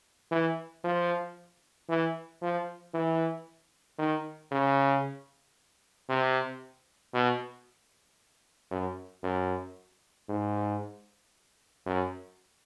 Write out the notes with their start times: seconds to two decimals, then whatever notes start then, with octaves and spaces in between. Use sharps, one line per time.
0.32 E3
0.84 F3
1.89 E3
2.42 F3
2.94 E3
3.99 D#3
4.51 C#3
6.09 C3
7.14 B2
8.71 F#2
9.23 F#2
10.29 G#2
11.86 F#2